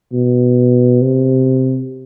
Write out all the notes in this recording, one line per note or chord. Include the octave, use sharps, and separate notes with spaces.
B2
C3